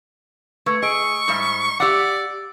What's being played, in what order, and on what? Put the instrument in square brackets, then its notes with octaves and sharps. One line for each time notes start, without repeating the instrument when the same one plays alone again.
[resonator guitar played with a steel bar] A3 [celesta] B4 C#6 G#6
[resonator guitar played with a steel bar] G#4 [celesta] D#5 E6 D7 [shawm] C#6
[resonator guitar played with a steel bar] G#2 G3 E5
[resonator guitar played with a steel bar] G4 E5 F#5 [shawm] D5 [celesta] D6 E6